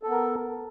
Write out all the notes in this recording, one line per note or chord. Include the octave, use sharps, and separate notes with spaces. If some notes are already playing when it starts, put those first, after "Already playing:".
B3 A4 A#4